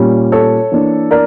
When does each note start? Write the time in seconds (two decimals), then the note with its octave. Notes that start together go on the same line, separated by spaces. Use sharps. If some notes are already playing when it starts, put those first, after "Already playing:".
Already playing: A#2 G3 C#4
0.32 A4 C#5
0.72 E3 A#3 D4
1.11 A#4 D5